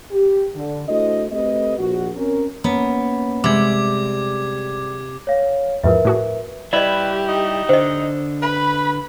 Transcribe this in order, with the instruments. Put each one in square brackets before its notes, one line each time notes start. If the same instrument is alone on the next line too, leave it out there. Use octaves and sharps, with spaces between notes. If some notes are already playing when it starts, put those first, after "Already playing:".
[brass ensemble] G4
D3
A3 D4 E4 F#4 C5 D#5
A3 C4 G4 A4 B4 D#5
A#1 F#4
C4 C#4 A#4
[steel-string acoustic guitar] A#3 C#4 C#5 [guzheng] B3
[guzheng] C3 [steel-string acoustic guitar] G3 G#3 [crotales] D6 G#6
[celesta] C#5 F5
[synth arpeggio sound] E2 G#2 F3 [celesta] A#4 B4 E5
[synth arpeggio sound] A2 F#4 G#4
[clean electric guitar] G3 E4 [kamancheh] G4 [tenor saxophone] B4 [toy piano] D5 D#5
[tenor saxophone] D#4
[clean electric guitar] D3 [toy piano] C5 D#5
[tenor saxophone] B4 [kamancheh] B5